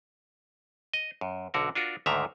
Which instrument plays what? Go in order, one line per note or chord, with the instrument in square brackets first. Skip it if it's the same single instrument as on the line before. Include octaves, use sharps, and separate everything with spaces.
[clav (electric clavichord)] D#5
F#2
B1 D3 F#4 A#4
D4 F4 F#4 A#4
D2 G#2 D3 D#3 E5 A#5